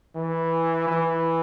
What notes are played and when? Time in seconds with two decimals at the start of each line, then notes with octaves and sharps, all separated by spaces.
0.16 E3
0.88 E3